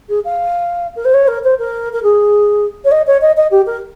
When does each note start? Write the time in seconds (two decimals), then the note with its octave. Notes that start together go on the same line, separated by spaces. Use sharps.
0.09 G#4
0.25 F5
0.96 A#4
1.05 C5
1.14 C#5
1.28 A#4
1.44 C5
1.59 A#4
1.93 A#4
2.03 G#4
2.85 C#5
2.92 D#5
3.07 C#5
3.21 D#5
3.37 D#5
3.51 G4
3.66 A#4